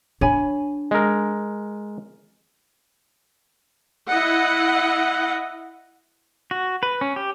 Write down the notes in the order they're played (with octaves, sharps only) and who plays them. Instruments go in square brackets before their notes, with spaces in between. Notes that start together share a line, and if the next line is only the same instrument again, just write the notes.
[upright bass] D4 [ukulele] C#5 G#5 B5
[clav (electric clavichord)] G#3 A#4
[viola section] E4 D#5 F#5
[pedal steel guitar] F#4
B4
C#4
G4